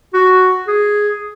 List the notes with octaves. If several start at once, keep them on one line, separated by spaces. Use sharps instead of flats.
F#4
G#4